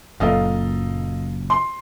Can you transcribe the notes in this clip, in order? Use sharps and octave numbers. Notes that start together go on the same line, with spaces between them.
F#1 F#2 A#2 A4 D#5 F5
C6